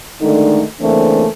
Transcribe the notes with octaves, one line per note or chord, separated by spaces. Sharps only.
D3 D#3 G#3 A3 D4 D#4
C#3 E3 A3 A#3 C4 D4